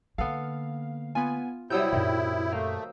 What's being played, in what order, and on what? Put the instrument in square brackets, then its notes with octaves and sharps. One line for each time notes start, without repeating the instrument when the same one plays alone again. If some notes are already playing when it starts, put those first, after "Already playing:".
[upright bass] D3 A#3 [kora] B3 A4 [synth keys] F5
[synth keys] B3 G#5 [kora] F4
[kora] C3 F#3 G3 [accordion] E4 [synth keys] D#6 E6 G6
[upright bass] F#2 A#2 [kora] D#3
[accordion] A3 [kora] A#3 C5